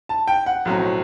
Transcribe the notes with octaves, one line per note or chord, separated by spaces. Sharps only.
A5
G5
F#5
B1 A2 F#3 C4